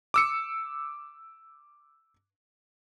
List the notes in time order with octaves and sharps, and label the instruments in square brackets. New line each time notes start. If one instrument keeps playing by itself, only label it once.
[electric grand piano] D6 E6 C#7